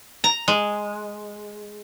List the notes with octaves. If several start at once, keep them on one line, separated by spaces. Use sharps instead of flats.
A#5
G#3